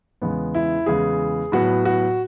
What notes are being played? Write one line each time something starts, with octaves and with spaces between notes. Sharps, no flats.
E2 C#3 G#3 B3
E4
E2 C#3 G#3 B3 G#4
A2 F#3 B3 F#4
F#4